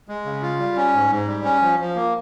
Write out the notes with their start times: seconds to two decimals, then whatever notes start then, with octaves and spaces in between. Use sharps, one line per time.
0.08 G#3
0.25 C#3
0.42 F4
0.59 G3
0.76 C#4
0.94 G#2
1.11 G#2
1.27 G3
1.44 C#4
1.62 F3
1.80 F3
1.96 A#3